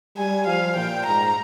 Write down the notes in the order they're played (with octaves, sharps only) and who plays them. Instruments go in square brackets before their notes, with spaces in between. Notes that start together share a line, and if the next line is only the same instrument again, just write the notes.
[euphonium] G3 [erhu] G#5
[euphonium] F3 [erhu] F5
[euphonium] A#2 [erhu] G5
[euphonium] G#2 [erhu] A#5